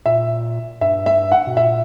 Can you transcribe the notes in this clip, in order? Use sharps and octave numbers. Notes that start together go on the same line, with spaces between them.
A#2 E5
G2 E5
E5
F#5
B2
A#2 E5